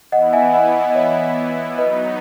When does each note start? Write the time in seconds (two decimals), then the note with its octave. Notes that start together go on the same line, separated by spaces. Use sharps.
0.12 E3 B3 E4 D#5 F#5
0.33 E5 G#5
0.54 D#5 F#5
0.90 D#5
0.95 C#5 E5
1.78 F#3 B3 D#4 B4 D#5